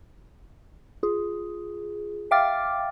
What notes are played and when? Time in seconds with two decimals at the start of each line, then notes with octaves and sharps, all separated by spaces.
1.03 F4 G#4
2.31 E5 F5 G5 D6 F6 A6